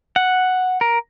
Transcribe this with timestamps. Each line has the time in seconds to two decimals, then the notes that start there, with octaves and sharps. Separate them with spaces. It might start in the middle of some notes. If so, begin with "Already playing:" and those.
0.16 F#5
0.81 A#4